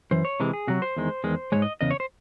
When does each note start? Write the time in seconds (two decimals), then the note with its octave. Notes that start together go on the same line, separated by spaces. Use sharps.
0.11 F#2 E3 C5
0.25 C#5
0.40 C3 E3 G#3
0.53 G#4
0.67 C3 F#3 F#4
0.82 C5
0.97 E2 D#3 G#3
1.24 E2 D#3 G#3
1.52 G#2 E3 G#3 C#5
1.62 D#5
1.81 E2 C#3 D#5
1.91 C#5
2.00 C5